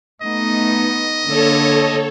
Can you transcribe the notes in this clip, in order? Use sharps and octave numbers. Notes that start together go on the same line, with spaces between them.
A3 B3 D#4 D#5
D3 A#3 A4 C#5